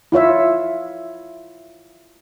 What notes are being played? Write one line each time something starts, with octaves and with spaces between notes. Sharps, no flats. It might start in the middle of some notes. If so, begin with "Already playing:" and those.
E4 F4 C#5 E5